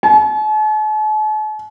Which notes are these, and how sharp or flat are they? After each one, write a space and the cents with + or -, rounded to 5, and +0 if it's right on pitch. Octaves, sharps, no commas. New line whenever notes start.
A5 -45